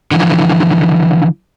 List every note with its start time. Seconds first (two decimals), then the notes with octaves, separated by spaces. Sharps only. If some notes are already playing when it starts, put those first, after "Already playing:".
0.11 D3 E3 F3